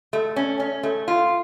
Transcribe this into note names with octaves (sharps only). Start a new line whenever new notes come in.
A3
C#4
C#4
A3
F4